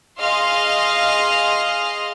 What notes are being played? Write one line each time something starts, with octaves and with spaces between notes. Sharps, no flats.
G#4 D#5 F5 C6 F6